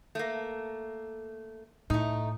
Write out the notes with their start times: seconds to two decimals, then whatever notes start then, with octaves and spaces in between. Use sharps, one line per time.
0.15 A3 A#3
1.90 A2 A3 D#4